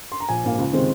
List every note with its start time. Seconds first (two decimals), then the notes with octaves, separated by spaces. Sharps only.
0.12 C6
0.20 A#5
0.29 A#1 G#5
0.44 G#2 F3 A#3
0.58 C#2
0.73 C3 D#3 G#3 C4